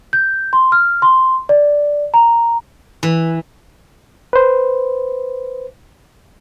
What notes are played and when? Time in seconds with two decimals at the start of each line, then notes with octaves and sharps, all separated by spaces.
0.13 G6
0.53 C6
0.72 F6
1.02 C6
1.49 D5
2.14 A#5
3.03 E3
4.33 B4 C5